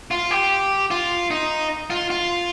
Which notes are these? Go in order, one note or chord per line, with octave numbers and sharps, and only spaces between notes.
F4
G4
F4
D#4
F4
F4